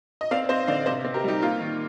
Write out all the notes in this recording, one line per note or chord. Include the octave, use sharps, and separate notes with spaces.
D#5
C4 D5 F5
C4 C5 D#5
D3 D5 F5
C3 C5 D#5
C4
G4 A#4
G3 D#4 G4
A#3 F4
D#3